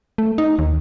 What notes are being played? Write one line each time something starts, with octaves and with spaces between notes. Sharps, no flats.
A3
D#4
D#2